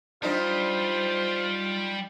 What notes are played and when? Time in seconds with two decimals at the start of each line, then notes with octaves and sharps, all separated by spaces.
0.22 G3 D4 D#4 F4 C5 D#5